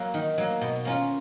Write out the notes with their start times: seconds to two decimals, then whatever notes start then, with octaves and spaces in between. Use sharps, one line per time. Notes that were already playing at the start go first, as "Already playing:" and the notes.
Already playing: F#3 A#3
0.14 D#3
0.38 F#3 A#3
0.61 B2
0.85 A#3 C#4 F4